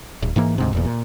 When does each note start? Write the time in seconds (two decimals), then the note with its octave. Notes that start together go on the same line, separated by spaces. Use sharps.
0.23 D1
0.36 G#2 E3 A#3
0.58 D2 G#2 C3
0.73 F1 E2 A#2
0.85 A#2